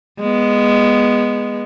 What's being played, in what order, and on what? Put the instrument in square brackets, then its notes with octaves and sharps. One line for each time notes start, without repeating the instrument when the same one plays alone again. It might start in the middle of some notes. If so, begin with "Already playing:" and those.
[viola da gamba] G#3 B3